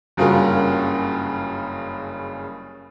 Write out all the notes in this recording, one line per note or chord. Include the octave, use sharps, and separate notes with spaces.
F#1 G2 C#3 F4 F#4 A#4